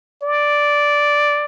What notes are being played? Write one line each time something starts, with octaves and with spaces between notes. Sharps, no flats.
D5